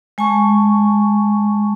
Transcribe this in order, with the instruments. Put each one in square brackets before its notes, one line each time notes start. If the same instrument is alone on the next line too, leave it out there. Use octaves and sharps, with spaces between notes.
[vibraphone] G#3 G#5 A5 C#6